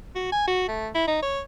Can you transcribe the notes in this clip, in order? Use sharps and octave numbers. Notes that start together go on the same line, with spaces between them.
F#4
G#5
F#4
A3
E4
D#4
C#5